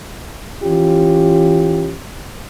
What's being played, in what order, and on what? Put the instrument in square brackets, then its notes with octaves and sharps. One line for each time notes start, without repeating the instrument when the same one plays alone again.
[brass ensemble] E3 C#4 F4 G4